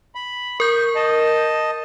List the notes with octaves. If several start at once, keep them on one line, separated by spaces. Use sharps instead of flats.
B5
A#4 C#6 G6
D#5 A5